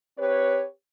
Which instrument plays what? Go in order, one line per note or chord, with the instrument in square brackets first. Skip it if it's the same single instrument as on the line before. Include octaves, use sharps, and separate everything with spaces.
[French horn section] C4 G4 B4 C#5